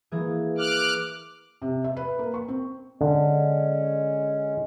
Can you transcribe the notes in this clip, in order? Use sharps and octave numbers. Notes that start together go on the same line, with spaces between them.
E3 A#3 G#4
D6 F6 F#6
C3
E5
B4
A#3
C#6
C4
D3 G#3 C#4